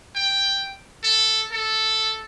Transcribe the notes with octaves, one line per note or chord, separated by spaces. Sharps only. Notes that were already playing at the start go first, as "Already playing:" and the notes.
G5
A4
A4